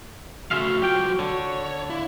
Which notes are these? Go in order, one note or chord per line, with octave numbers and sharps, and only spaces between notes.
C#3 A3 F4 F#4 E5 F5
F#3 F4 G4 G5
D3 C#5
E4 F5